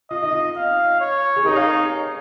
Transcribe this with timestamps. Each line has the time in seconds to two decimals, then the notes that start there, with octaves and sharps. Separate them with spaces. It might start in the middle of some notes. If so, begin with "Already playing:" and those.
0.10 F4 D#5
0.22 D#4
0.33 F4
0.56 F5
1.00 C#5
1.36 G#4
1.45 D#4 G4 A#4
1.56 C#5 F5